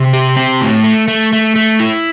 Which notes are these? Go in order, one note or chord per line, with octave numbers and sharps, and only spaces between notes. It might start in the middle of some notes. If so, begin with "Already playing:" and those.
Already playing: C3
G4
C4
A2
A3
A3
A3
A3
E4